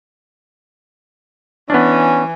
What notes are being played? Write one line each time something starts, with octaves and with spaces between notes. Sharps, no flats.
E3 B3 C#4 D4